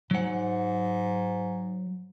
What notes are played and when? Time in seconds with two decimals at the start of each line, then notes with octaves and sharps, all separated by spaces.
0.11 G#2 F#3 F#5